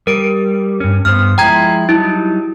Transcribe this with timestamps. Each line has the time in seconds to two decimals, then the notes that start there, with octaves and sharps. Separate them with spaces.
0.07 G3 A#4 D7
0.80 G2 C#4
1.05 G2 B3 C5 F6
1.38 F3 G#3 E4 G5 A#5 G#6
1.89 F#3 G3 D#4 E4